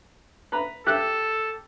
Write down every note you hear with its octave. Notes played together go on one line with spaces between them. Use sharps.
B4 A#5 B5
G4 A4 F#6